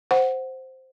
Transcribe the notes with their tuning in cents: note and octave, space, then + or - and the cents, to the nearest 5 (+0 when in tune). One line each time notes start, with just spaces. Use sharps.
C5 +0 F#5 +0